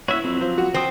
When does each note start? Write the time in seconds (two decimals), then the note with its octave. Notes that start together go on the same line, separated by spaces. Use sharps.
0.08 E4 F#4 C#5 E5
0.24 F2 F#3 C4
0.41 F3 C5
0.58 F#4
0.74 F2 D3 C4 D#6